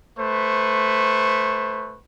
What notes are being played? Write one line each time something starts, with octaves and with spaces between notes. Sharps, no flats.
A3 B4 C5 C#6